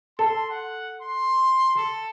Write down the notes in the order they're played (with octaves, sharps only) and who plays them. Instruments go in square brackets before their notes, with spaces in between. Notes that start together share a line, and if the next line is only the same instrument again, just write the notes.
[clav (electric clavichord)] A4 [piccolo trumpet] C6
[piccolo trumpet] F#5
C6
A4